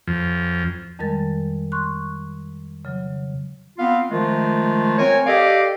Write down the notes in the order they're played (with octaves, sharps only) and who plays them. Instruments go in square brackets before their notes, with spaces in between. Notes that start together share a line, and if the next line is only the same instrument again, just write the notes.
[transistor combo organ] F2
[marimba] F2 D#3 G3 G#3 A#4 A6
C6 C#6 F#6
C#3 F#3
[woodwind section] B3 C4 F4 F5
D#3 F3 G#3 A3 F4
C4 A#4 C#5 G#5
G4 A4 D5 D#5 F5